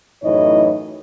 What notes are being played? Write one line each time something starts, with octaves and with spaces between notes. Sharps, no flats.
F#2 A2 E3 D#4 C#5 D#5